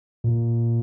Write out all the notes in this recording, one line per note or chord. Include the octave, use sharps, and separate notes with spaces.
A#2